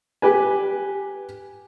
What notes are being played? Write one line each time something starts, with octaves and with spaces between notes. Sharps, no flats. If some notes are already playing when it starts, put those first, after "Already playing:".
G4 B4 G#5